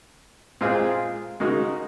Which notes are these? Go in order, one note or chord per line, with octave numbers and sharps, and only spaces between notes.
A#2 G#3 C4 F4 G#4
C#3 G#3 D#4 F#4 A#4